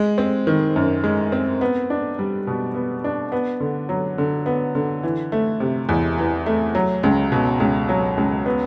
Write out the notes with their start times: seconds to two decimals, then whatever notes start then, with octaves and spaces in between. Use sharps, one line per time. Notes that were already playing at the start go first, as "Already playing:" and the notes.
Already playing: G#3
0.18 C4
0.47 D#3
0.76 F#2
1.04 G#3
1.32 C4
1.61 B3
1.90 D4
2.19 G3
2.47 B2
2.75 B3
3.04 D4
3.32 B3
3.60 D3
3.89 F#3
4.18 D3
4.46 B3
4.75 D3
5.03 E3
5.32 A3
5.60 C3
5.89 E2
6.18 E3
6.46 A3
6.75 F#3
7.03 C#2
7.32 B2
7.60 C#2
7.89 F#3
8.17 C#2
8.46 B3